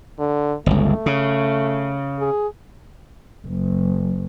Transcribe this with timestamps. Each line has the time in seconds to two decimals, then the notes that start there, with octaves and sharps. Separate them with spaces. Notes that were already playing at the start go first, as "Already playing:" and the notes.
0.19 D3
0.66 G1 C#2 A3
1.06 C#3
2.20 G#4
3.47 F#1